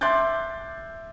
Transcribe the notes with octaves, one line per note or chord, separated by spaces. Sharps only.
E5 C6 D6 F#6 G6 A6